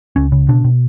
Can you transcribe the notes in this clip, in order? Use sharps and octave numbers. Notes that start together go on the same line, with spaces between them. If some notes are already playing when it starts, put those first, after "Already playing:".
C#2 C#4
C#3
B2 D4
B2